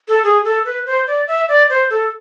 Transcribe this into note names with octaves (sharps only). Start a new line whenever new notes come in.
A4
G#4
A4
B4
C5
D5
E5
D5
C5
A4